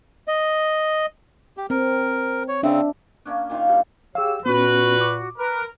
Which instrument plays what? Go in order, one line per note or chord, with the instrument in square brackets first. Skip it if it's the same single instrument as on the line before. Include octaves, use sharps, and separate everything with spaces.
[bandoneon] D#5
G4
[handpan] C4 [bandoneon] A#4
[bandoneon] C#5
[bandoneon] C#3 C4 [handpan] D4 E5
[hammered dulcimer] A#3 C#4 D4
A#2 D#3 F4 F5
G2
[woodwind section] G4 C#5 E6 [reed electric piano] G#4 F5
[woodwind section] A#2 F#4 [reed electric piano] B3 C#4 [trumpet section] B4
[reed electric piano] D6
[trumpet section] A#4 [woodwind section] B4